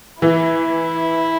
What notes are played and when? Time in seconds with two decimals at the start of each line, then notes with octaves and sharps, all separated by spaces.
0.22 E3 E4